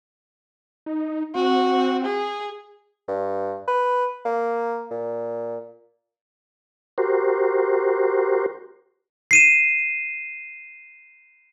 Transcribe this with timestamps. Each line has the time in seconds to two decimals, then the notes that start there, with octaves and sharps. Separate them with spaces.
0.86 D#4
1.35 C4 F#4
2.05 G#4
3.08 G2
3.68 B4
4.25 A#3
4.90 A#2
6.98 F#4 G4 A#4 C5
9.31 C7 D#7 E7